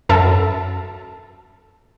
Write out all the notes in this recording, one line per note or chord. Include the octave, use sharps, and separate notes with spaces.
F#2 A4 A#4 E5 A5